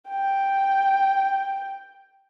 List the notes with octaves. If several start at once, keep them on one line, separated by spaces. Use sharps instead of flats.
G5